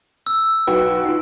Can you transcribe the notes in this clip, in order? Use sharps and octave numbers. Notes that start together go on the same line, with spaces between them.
E6
B1 F#4 B4 G5
D#4 F4